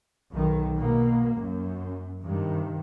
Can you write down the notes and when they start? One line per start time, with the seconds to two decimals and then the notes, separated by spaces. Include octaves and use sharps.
0.31 B1 D#3
0.78 B2 A#3
1.34 F#2
2.21 G2 C3 D#3